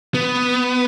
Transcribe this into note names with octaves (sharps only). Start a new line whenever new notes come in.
B3